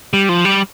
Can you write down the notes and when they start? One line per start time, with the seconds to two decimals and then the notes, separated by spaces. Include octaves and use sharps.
0.13 G3
0.29 F3
0.45 G3